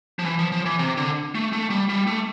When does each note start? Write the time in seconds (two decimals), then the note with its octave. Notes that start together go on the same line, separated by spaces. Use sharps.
0.19 F3
0.25 E3
0.39 F3
0.52 F3
0.65 E3
0.79 C3
0.97 D3
1.35 A3
1.53 A3
1.70 G3
1.89 G3
2.07 A3